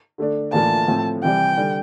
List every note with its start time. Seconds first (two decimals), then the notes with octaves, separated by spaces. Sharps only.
0.18 D3 A3 D4
0.53 A2 E3 A#3 D4 F4 A5
0.88 A2 F3 C4
1.22 C3 E3 G3 G5
1.57 D3 G3